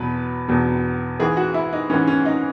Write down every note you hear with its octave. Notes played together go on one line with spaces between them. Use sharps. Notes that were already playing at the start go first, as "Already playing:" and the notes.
Already playing: E2 B2 F#3 B4
E2 B2 F#3
G#2 E3 G#4
F#4
E4
D#4
G#2 E3 C#4
C#4
D#4